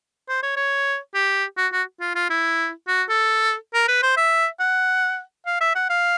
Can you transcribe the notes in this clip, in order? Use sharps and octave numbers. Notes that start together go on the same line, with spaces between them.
C5
C#5
C#5
G4
F#4
F#4
F4
F4
E4
F#4
A4
A#4
B4
C5
E5
F#5
F5
E5
F#5
F5